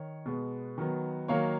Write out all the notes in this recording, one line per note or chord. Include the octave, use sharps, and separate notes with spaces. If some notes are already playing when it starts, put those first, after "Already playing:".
Already playing: D#3 C#5
B2 G#3 B3
D#3 F#3 B3
D#3 F#3 A#3 C#5 F5